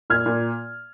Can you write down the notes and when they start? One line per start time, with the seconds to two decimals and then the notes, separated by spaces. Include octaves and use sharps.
0.10 A#2 F6 G#6
0.26 A#2